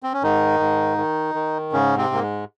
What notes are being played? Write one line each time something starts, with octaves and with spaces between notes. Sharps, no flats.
C4
C#4
G#2 D#3 D#4
G#2
D#3
D#3
G#2 C#3 C#4
C3 C4
G#2 A#3
G#3